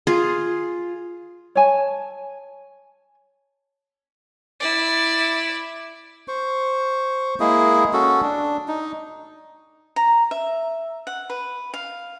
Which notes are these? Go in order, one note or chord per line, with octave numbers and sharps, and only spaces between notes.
F4 G#4
C#5 G#5 A5
E4 D5
C5 C#6
G#3 A#3 E4 G#4
C#4 F#4 A4
D4
D#4
A#5
E5
F#5
B4
F5